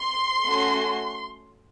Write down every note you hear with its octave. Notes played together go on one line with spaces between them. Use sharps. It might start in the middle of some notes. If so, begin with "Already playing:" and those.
Already playing: C6
A3 C#4 F#4